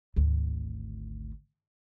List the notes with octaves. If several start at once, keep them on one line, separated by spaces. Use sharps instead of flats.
G#1 D2